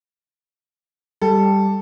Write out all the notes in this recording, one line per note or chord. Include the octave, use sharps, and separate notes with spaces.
G3 A4